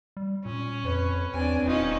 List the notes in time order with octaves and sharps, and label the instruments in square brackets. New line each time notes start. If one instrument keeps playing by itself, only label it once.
[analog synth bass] G3
[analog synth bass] A#2 [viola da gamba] C#4
[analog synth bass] F2 [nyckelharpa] B4 C#5
[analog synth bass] E2 [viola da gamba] C4 D4 [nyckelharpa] G#5
[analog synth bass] D#1 [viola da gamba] C#4 [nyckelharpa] D#4 F4